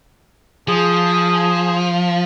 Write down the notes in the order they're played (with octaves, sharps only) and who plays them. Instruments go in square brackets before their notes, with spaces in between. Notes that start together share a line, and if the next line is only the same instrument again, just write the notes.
[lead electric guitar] F3 [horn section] G#4